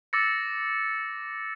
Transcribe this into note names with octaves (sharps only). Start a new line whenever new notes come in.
D6 E6 A6 A#6 C#7